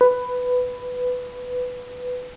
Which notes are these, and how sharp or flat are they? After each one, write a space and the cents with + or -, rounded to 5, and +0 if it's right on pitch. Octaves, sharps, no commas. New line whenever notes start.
B4 +10